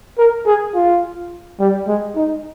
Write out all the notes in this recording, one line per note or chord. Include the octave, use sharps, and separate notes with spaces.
A#4
G#4
F4
G3
G#3
D#4